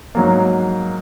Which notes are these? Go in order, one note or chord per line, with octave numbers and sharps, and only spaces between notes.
G#2 F#3 A#3